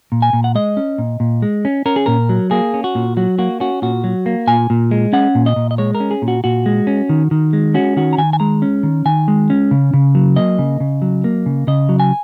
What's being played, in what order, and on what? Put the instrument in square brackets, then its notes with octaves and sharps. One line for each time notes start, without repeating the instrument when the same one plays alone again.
[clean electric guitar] A#2
G#5
A#2
F#5
G#3 D#5
C#4
A#2
A#2
G#3
C#4
C#4 A#4
G#4
A#2 A#4
F#3
A#3 G#4
C#4
F#4
A#2
F#3 F#4
A#3 F#4
C#4 F#4
A#2 F#4
F#3
A#3
A#2 G#5
A#2
G#3
C#4 F#5
A#2
D#5
A#2
D#5
G#3 C#5
A#4
C#4
G#4
A#2
F#4
A#2 F#4
G#3
C#4
D#3
D#3
G#3
C#4 F#4
D#3 F#4
A#5
D#3 G#5
G#5
G#3 A#5
C#4
D#3
D#3 G#5
G#3
C#4
C#3
C#3
F#3
A#3 D#5
C#3
C#3
F#3
A#3
C#3
C#3 D#5
F#3
G#5